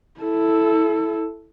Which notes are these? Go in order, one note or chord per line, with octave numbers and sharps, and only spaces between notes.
E4 A4